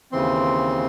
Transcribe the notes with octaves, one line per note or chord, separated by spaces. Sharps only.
D#2 C#3 E3 C4 C6